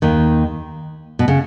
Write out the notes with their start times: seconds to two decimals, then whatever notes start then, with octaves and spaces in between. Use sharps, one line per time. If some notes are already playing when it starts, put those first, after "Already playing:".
0.02 D#2 D#3
1.19 B2
1.28 C#3